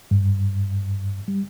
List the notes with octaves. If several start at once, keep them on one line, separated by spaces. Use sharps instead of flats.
G2
G3